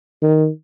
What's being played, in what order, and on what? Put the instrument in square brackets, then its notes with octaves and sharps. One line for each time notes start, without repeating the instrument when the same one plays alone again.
[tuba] D#3